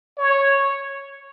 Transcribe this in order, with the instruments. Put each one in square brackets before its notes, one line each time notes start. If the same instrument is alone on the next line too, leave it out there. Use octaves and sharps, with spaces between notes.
[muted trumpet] C#5